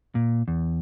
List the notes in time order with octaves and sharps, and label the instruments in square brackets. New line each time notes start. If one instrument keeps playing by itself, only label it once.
[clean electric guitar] A#2
E2